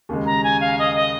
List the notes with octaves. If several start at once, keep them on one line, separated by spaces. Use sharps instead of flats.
D#2 C#3 G#3
A#5
G#5
F5
D#5
D#5